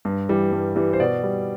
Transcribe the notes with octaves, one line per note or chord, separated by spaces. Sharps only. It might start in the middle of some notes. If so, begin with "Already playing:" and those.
G2
E3 G3
G2
E3 G3
C5
B2 D5
G3